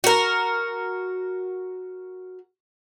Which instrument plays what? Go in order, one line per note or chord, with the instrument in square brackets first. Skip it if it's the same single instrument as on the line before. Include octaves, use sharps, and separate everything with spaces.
[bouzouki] F#4 A#4